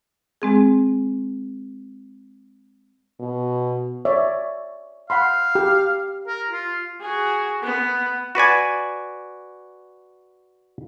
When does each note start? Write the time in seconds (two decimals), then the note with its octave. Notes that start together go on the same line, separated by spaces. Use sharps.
0.42 G#3 C4 G#4
3.19 B2
4.05 C#5 D5 E5
5.10 F5 F#5 B5 C6
5.55 G4
6.27 A#4
6.49 F4
7.02 F#4 G#4
7.63 B3
8.35 F#4 B4 D5 G#5